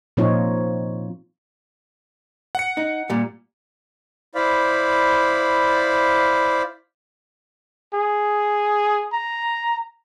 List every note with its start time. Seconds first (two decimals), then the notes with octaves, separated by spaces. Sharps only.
0.17 A#2 F3 C4 D#4 F4 C#5
2.55 F#5 C#7
2.77 D#4
3.10 A#2 G3
4.35 E4 C5 D5 F5 B5
7.94 G#4
9.13 A#5